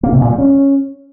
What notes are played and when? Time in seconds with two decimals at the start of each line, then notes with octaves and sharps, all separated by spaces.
0.03 A#3
0.12 C3
0.21 A#2
0.30 G3
0.38 C#4